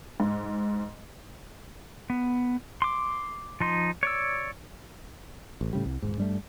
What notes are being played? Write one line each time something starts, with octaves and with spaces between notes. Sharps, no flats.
G#2
B3
C6 D6
F3 D#4 C6
C#5 D5 E6
A1
A2 C#3 G3
C2
D#1 C2 G#2
G2 G3 A3